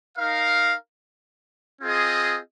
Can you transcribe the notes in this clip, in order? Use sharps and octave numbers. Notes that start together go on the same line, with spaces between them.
D#4 A#4 F5
C4 F4 G#4 D#5